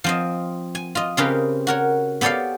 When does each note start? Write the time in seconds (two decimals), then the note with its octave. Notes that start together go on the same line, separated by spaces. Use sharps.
0.04 F3 C4 D#5
0.75 G#5
0.95 F4 D#5
1.17 C#3 C4 C#4 G4 A#4 B4
1.67 F#4 A#4 C#5
2.21 B3 G4 A4 C#5 D5 F5